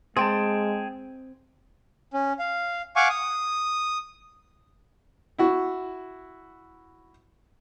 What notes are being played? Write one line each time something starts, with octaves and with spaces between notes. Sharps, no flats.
G#3 C4 G#4 G5 A5
C#4
F5
F5 F#5 G#5 C#6 D6
D#6
E4 F#4